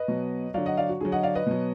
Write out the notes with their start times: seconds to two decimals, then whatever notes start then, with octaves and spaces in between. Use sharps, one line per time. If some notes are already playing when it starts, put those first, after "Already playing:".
Already playing: B4 D#5
0.08 B2 F#3
0.54 D3 F#3 D5 F5
0.66 D#5 F#5
0.77 D5 F5
0.89 F#4
1.01 D3 F#3 G#4
1.12 D#5 F#5
1.23 D5 F5
1.35 B4 D#5
1.46 B2 F#3